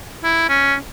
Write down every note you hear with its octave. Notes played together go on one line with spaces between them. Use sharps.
E4
C#4